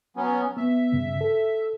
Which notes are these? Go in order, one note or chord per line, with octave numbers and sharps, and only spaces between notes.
F#3 B3 C#4
B3 E5
G2 C#3
A4